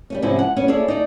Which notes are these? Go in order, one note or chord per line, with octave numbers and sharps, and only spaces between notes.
G3 A3 C#4
G#2 C3 F3 C#4 E4
F#5
G3 B3 C#4
E4 G#4 A4 C#5 D5
D#4 D5